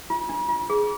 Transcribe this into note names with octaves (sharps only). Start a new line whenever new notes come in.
F4
D4
F4
G#4